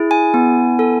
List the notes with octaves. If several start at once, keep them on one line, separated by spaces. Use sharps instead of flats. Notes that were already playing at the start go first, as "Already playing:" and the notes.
Already playing: E4 G#4
G#5
B3
A4